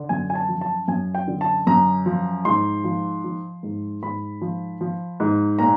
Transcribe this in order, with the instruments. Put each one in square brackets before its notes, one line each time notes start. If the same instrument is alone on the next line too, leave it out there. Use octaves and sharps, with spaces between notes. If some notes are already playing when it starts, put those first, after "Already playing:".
Already playing: [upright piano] D3
F#2 G#5
G#5
A5
F3
A5
F#2 G#5
G5
D3
A5
F#2 A#5
F3
G#2 C6
F3
F3
G#2
G#2 B5
F3
F3
G#2
A#2 A#5